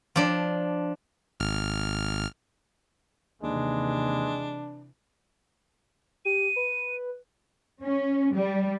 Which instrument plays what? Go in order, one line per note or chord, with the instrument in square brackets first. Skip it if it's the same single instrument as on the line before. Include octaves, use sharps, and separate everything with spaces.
[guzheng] F3 D4
[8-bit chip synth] G#1 F6
[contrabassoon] D#2 [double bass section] C3 E3 [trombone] G#3 [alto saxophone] D4
[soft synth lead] G4 [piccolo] D#7
[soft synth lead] B4
[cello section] C#4
G3